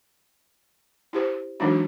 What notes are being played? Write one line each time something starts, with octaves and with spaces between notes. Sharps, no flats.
E4 G4 C5
E3 F#3 G#3 D4 D#4 F#4